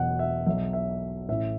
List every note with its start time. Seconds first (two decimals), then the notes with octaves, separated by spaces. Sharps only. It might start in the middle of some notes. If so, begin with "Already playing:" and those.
Already playing: E1 E2 B2 F#3 F#5
0.19 E5
0.46 B1 B2 F#3 E5
0.73 E5
1.28 A1 A2 E3 E5